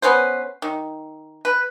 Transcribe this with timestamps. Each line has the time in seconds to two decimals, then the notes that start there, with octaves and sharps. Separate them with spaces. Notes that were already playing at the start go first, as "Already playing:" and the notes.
0.02 B3 C#4 B4 C5
0.62 D#3
1.45 B4